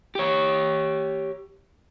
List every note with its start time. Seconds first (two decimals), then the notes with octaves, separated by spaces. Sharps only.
0.15 G4 C#5